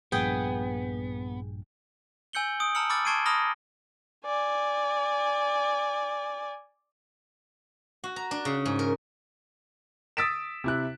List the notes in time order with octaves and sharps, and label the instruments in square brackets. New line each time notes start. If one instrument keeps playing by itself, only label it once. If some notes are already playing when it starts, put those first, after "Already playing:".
[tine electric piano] A#1 G2 A#2 [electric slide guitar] B3 [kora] G#4 [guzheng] G5
[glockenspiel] G#5 E6 G6 C#7 F#7 G7
D#6 D7
A5 A#5 E6 F6 C#7 F#7
B5 D6 E6 F6 A6
A5 C#6 G#6 C7 D7 D#7
A#5 B5 D#6 F6 A#6 G7
[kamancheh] D5 G#5
[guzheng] F#4
A#5
D4
C#3
G#2
A#4
[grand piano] D#6 E6 A6 B6 D7 E7
C3 E4 F#6